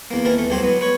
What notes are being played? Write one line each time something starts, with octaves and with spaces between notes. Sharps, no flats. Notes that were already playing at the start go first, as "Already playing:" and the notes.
E2 A#3
D#2 E3 A#4 A5
A3
C2 F#3 G4 C5
F#3 B3
B4 C#5